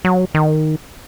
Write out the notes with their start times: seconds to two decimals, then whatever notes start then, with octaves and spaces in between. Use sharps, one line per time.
0.05 F#3
0.34 D#3